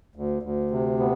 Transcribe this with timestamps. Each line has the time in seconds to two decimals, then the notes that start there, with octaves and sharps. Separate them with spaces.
0.16 D2
0.43 D2
0.71 C3
0.99 B3